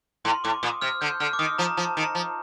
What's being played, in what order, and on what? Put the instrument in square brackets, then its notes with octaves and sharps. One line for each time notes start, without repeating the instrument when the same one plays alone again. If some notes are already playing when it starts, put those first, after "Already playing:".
[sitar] A2 [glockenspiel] C6
[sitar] A2 [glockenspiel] D6
[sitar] A#2 [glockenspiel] D#6
[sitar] C3 [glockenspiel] F6
[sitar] D3 [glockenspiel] G6
[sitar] D3 [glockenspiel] F6
[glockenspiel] D6
[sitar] D#3 [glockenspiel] D#6
[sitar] F3 [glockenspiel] A#5
[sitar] F3 [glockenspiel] A5
[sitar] D#3
[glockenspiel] A#5
[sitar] F3